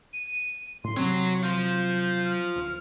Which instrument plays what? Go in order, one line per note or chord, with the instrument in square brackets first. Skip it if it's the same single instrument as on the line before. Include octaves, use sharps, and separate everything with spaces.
[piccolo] D#7
[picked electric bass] A2 [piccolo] C6
[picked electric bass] C3 F#3 C4 [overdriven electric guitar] F#4 C#5
[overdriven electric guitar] F4 C5 [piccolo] G6
[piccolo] F6
[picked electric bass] D1